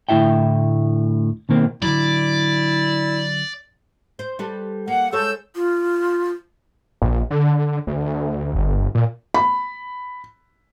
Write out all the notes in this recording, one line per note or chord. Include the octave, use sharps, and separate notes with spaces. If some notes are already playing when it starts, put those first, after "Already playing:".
D2 A2 E4 E5 G5
B2 D#3 A#3 C4
D3 F#3 E4 D5
C5
G3 A4 B4
A#3 F#5
G#3 A4 C#5 E6 G6
F4
A#1
D3
D2
G1
A#2
B5